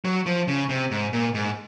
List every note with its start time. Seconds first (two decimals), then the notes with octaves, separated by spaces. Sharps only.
0.05 F#3
0.26 F3
0.48 C#3
0.69 C3
0.91 G#2
1.13 A#2
1.34 G#2